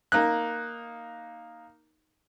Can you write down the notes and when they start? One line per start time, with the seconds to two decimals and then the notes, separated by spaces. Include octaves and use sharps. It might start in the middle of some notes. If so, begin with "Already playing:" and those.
0.12 A#3 D#4 F#6